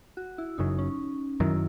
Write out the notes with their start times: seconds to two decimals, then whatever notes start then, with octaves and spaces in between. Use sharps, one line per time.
0.17 F#4
0.38 E4
0.58 F#1 F#2 C#3 F#3 D#4
0.78 C#4
1.40 F#2 D#3 F#3 E4